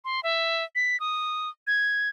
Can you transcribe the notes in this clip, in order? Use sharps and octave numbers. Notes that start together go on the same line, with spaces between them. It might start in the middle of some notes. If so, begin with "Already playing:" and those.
C6
E5
B6
D#6
G#6